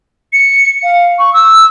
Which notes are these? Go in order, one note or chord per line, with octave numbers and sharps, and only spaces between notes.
C#7
F5
C#6
E6